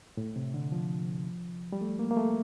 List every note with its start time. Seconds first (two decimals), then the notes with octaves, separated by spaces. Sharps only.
0.17 A2
0.36 C3
0.54 D3
0.72 F3
1.72 G3
1.81 A3
1.99 A#3
2.11 A#3
2.17 A3